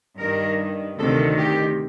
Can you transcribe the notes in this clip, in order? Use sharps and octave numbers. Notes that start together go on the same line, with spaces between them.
G2 D#3 A#4
D2 C3 D#3 A4
G4